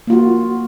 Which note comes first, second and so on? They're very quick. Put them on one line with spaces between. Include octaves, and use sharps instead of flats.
A#3 F4 F#4